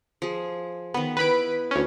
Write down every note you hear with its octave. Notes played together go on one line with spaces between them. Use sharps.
F3 G#4
D#3 B3 B4
B3 E4 B4 B5 D7
D2 C#4